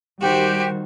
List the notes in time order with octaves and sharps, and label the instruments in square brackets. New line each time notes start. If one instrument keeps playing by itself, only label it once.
[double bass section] D#3 G3 [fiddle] F#4 C5 [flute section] G4